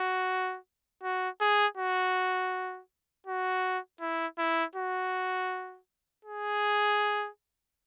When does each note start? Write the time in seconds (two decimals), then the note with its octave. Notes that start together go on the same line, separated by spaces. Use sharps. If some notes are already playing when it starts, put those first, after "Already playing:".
Already playing: F#4
1.03 F#4
1.41 G#4
1.77 F#4
3.27 F#4
4.01 E4
4.38 E4
4.76 F#4
6.25 G#4